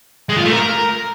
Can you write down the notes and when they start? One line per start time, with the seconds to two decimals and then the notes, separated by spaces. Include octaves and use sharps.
0.29 G#3
0.37 F4
0.45 A3
0.53 A#4